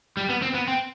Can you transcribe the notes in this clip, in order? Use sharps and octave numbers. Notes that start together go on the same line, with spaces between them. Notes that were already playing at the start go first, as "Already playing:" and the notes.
G3
B3
C4
B3
C4